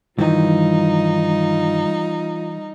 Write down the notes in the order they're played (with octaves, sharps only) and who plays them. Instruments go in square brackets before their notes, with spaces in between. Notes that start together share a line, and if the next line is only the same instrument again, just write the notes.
[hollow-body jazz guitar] G2 D#3 [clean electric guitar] E3 [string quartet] G3 D#4 [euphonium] F4